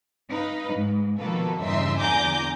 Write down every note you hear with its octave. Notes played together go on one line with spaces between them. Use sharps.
D#4 B4 F5
G#2
B2 D#3 F3 A#3 A4 B4
E2 G2 C#3 D#4 E5 C6
E2 D3 G#5 A#5 D6 G6